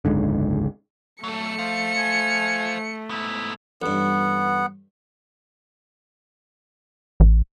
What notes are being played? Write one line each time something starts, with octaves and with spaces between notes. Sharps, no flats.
F#1 C#2 G#2 D3
F#3 A3 A4 C#7
C5 F5
G#5
G#2 B3 E4
A1 G2 B3 F#5
A1